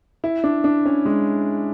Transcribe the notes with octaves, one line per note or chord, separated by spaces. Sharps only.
E4
D4
D4
C#4
G#3